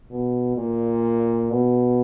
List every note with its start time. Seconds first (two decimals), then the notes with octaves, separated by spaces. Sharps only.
0.11 B2
0.57 A#2
1.50 B2